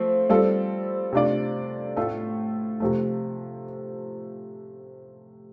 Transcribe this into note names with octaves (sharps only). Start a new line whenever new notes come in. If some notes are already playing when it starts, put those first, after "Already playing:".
Already playing: F3 A3 C4
G3 C4 F4 A4
C3 A3 D4 F4 D5
A2 A3 F4 A4
C3 F3 A3